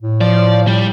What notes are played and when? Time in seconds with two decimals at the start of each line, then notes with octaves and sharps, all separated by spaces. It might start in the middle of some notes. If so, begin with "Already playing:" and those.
0.02 A2
0.21 F3 D5
0.67 G3